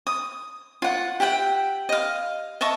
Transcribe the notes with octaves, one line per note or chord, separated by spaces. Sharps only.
D#6
F4 F#5
G4 E5 F#5 G5
D#5 F5
D#5 E5 A5 C#6